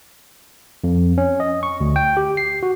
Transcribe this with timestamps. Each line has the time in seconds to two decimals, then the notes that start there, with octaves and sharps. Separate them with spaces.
0.84 F2
1.18 C#4
1.40 D#5
1.63 C#6
1.80 D2
1.96 G5
2.17 G4
2.37 C7
2.63 F#4